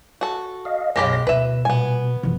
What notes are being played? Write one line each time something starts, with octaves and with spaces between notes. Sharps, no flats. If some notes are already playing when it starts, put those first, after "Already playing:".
F#4 A4
D#5 F5
B1 F#2 G#3 G4 C#5 F5 B5 A#6
D2 B2 E4 B4 E5
A#2 G3 B3 G#5
F#1 C3 E3 F3 C4